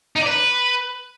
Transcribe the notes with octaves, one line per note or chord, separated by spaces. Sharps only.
D#4
D5
B4